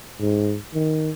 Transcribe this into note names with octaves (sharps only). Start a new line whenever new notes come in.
G#2
D#3